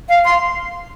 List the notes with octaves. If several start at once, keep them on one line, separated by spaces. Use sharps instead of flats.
F5
C6